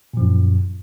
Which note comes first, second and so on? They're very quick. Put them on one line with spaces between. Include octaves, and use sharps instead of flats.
A#2 F3 F#2